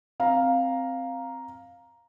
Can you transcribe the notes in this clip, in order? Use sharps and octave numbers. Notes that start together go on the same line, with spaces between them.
C4 F5 A#5